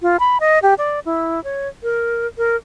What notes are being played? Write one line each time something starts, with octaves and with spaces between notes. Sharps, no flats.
F4
B5
D#5
G4
D5
E4
C#5
A#4
A#4